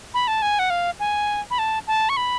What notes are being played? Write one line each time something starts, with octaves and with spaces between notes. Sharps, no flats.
B5
A5
G#5
F#5
F5
G#5
B5
A5
A5
C#6
B5